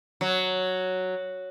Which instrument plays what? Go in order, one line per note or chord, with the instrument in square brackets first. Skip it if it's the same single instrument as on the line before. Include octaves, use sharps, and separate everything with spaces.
[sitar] F#3